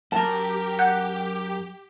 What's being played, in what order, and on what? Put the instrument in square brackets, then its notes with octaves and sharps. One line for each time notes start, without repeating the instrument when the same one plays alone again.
[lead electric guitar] F#2 A#4 [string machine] G4 [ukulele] A5
[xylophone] F#5 F#6 G6